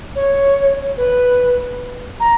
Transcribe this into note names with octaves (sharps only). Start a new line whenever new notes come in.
C#5
B4
A#5